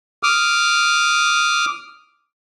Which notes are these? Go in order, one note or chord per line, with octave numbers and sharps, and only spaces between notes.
D6 D#6 F6